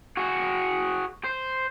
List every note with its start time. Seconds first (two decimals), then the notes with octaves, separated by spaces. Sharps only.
0.17 F#4 G#4
1.24 C5